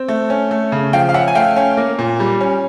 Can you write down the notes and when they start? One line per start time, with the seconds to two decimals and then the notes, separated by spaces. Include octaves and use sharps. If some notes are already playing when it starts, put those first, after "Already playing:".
Already playing: C4
0.08 A3
0.30 C#4
0.51 A3
0.72 C#3
0.93 F3 F5 G5
1.09 F5
1.14 C#4 E5 F#5
1.28 G#5
1.35 A3 F5 G5
1.56 C#4
1.77 A#3
1.99 A#2
2.20 G3
2.41 C#4